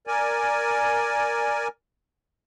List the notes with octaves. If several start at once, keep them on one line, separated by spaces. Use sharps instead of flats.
A#4 D5 G#5